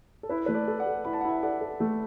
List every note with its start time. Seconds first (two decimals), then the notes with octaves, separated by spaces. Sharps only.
0.23 A4
0.29 E4 B4
0.46 A3 B4
0.54 A4 D5
0.68 A4
0.80 D5 F#5
0.86 A4
1.05 E4 B5
1.13 A5
1.21 F#5
1.24 E4 E5 A5
1.43 A4 D5 F#5
1.61 A4
1.80 A3